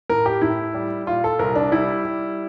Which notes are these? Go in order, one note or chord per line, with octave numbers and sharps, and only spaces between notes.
A2 A#4
G4
A2 E4
G3
A#2 F4
A4
C2 A#4
D4
G3 E4
G3